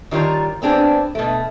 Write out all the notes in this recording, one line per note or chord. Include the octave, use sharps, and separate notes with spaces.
D#3 G3 F4 C#5 A#5
B3 C4 D4 G#4
B2 A3